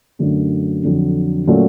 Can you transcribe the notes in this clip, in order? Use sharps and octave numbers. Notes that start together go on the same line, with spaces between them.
F#2 D3 F#3 A3 D4
F2 D3 F#3
A#2 F#3 A3 C#4